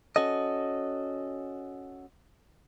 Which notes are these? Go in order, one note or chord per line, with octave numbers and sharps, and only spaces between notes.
C#4 F#4 A4 D#5